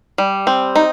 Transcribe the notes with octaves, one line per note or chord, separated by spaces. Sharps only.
G3
C4
D#4